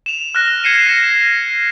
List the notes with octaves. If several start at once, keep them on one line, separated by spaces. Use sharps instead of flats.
E7 F7
F6 F#6 A#6
G#6 C7 C#7 D#7 E7
A#6 E7